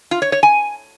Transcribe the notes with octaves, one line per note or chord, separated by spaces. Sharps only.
F4
C#5
C#5
G#5